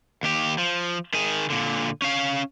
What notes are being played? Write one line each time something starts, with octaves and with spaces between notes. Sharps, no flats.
D#2 G4
F3
D#3 G#4
A#2 D3
C#4 F5